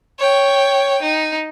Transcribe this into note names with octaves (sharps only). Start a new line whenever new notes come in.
C#5 G5
D#4